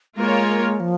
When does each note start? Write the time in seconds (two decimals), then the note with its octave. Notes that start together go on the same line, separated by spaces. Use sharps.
0.17 G#3 A#3 F4 A#4 C#5
0.80 F3